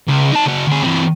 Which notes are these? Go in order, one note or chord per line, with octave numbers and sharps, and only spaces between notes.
C#2
D#4 A5
C#3 F#4
D2 G#4
E3 C4